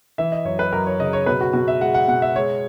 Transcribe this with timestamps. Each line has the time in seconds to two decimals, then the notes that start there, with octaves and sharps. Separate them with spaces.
0.18 E3 E5
0.32 D#5
0.45 F#2 C#5
0.59 B4
0.72 F#2 A#4
0.87 C#5
0.99 C#3 D#5
1.13 C#5
1.26 B2 B4
1.41 F#4
1.53 B2 F#4
1.68 E5
1.81 G#3 F#5
1.94 F#5
2.08 B2 F#5
2.22 E5
2.36 G#3 C#5